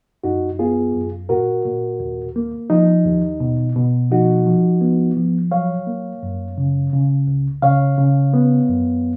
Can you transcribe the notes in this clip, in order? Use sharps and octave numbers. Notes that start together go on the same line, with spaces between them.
F#2 D#4 F#4
B3 F4 G#4
F#2
A#2 F#4 A#4
A#2
D#2
A#3
F3 D#4
D#2
B2
B2
F3 D#4 F#4
F3
B3
F3
F#3 C#5 F5
A#3
F#2
C#3
C#3
C#2
C#3 C#5 F5
C#3
B3
F#2